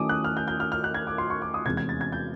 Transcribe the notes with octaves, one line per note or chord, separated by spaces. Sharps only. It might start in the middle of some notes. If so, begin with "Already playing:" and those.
Already playing: D#3 F#3 A3 C#4 E4 D6 D#6
F#6
F6
G6
G6
F6
F6
F#6
G#6
D6
C6
C#6
D6
D#6
E2 C3 E3 G#3 C#4 G#6
G#6
A6
G#6
G6